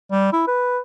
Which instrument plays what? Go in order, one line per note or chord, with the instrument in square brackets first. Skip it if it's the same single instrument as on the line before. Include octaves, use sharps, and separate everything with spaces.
[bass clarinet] G3
E4
B4